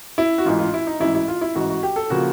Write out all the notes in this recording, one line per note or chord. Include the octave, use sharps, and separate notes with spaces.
E4
F#4
A1 G#2 E3 F4
F4
E4
D#4
A1 G#2 E3 E4
E4
F4
E4
A1 G#2 E3 F#4
F#4
G4
A4
C#3 F3 A#3 F#4